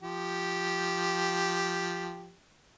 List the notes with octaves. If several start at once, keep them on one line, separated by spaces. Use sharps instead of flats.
F3 G4